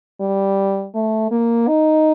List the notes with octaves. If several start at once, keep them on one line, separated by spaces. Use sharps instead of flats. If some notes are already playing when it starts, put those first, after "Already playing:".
G3
A3
A#3
D#4